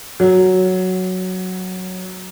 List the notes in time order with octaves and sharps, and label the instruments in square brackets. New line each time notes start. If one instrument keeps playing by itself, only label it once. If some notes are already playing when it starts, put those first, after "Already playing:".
[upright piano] F#3